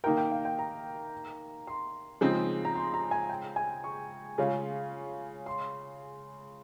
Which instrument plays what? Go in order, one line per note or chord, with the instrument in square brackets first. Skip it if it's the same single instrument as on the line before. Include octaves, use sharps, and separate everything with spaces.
[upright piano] D#3 A#3 D#4 A#4 [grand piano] G5
[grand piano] G5
F5
G5
A#5
C6
[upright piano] C#3 F3 G#3 C4 D#4
[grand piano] A#5
C6
A#5
G#5
G5
G#5
C#6
[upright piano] C#3 G#3 C#4 F4
[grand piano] C6